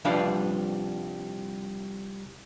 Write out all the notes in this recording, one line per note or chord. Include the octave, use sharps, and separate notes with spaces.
C2 F3 G3 D4 B4 F5